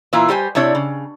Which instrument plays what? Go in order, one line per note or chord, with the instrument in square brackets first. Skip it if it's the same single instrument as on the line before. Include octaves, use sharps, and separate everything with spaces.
[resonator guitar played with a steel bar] A#2 E3 A#3 E4 F4
G3 G4 C5 G#5
C3 D4 E4 C#5 D5
C#3